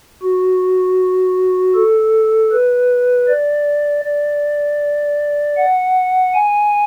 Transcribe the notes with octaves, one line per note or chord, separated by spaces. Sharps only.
F#4
A4
B4
D5
D5
F#5
G#5